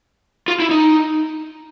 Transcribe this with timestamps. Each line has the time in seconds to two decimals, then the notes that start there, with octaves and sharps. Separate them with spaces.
0.48 F4
0.60 E4
0.71 D#4